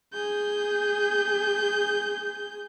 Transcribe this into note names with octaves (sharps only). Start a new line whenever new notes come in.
G#4 G6